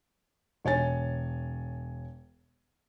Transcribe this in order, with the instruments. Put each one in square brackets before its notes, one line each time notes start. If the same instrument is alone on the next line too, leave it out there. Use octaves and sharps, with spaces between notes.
[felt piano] E1 C#5 G#5 A6